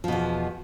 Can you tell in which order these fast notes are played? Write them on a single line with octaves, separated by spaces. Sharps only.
F3 B2 E2